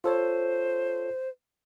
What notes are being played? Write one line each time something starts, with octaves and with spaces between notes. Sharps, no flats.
F4 A4 C5 C#5